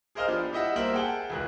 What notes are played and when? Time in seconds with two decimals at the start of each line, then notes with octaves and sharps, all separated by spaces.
0.15 G#4 A#4 C5 D#5 F5 F6
0.27 F3 B3 D4 G4
0.52 E4 G4 D#5 E5 F#5
0.76 G3 A#3 A#4 C5 E5 F#7
0.93 G#4 F#5 G5 A5
1.30 E1 C#2 F#6